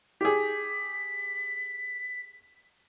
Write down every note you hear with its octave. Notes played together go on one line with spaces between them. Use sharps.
G4 G#4 B6